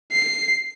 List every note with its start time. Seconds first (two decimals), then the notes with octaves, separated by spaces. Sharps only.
0.12 C7